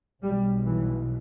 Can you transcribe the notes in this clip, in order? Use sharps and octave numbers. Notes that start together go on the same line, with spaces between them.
B1 B2 G3
E3